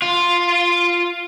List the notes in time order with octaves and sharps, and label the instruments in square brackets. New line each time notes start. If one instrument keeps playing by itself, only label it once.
[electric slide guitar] F4